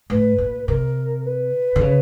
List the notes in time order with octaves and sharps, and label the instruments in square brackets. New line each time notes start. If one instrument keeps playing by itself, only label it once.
[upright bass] A2 [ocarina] B4
[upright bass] A#2
[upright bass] C3 [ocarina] A#4
[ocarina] B4
[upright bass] D3
C#3